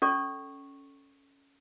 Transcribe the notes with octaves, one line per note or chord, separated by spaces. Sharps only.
C#4 A4 D5 C#6